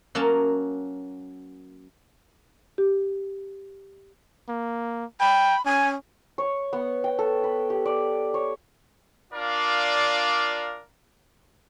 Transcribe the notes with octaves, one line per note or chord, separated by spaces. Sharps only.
F#3 A#3 C#4 A5
G4
A#3
G5 B5
C#4 G#5
C#5
B3
G5
A4
B4
G4
D5
C#5
D4 F4 A#4 D5 F5